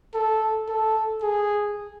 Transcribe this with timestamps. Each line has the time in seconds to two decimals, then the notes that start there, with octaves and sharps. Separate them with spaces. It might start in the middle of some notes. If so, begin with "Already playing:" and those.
0.15 A4
0.69 A4
1.22 G#4